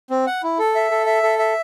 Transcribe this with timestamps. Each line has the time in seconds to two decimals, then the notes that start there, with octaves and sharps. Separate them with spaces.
0.10 C4
0.27 F#5
0.43 E4
0.59 A4
0.75 E5
0.91 A4
1.06 E5
1.23 A4
1.39 E5